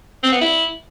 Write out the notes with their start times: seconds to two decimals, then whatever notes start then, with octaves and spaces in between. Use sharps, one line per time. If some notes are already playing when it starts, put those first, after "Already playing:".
0.23 C4
0.32 B3
0.41 E4